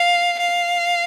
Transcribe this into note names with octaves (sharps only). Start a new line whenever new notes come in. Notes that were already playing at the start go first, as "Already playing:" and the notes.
Already playing: F5
F5